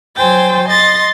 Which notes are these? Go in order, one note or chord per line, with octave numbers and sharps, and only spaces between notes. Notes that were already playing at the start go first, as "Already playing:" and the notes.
F#3 C5 G5 G#5 A6
D#5 C6 A6 A#6